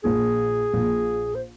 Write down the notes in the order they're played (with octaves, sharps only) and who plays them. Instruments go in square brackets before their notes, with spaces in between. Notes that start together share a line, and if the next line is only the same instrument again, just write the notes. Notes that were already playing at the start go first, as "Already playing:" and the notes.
[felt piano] A#1 A#2 F3 [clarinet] G#4
[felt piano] A#1 A#2 F3
[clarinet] C5